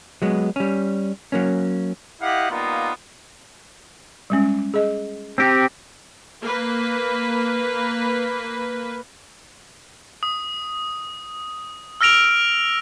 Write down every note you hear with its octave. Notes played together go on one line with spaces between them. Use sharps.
F#3 G#3 B3
G3 C#4
F#3 A#3 C#4
E4 G4 D#5 F5 F#5
G3 A#3 B3 D#4 F4
G3 G#3 C#4
G#4 D#5
C4 G4
A#3 B4
D#6
E6 F6 A#6 D7 F7